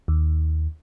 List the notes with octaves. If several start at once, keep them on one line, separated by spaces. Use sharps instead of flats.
D#2